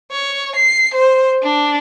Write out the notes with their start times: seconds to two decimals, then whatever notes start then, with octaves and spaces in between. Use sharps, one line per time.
0.11 C#5
0.56 C7
0.94 C5
1.42 D4